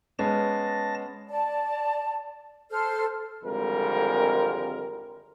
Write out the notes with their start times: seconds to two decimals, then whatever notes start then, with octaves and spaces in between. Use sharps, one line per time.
0.19 G#3 B3 C#4 A5 A#6
1.29 D5 A5
2.71 A4 C5 F6
3.44 G#1 F2 D3 G3 G#3 A#4